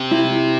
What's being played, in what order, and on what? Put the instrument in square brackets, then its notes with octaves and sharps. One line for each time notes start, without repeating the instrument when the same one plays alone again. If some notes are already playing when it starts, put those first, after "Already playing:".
Already playing: [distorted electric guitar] C3
[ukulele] E4